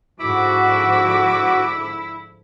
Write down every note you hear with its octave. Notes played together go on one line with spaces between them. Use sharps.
G#2 D3 F3 E4 F#4 D6